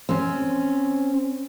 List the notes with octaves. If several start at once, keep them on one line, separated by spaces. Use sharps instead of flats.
C4 C#4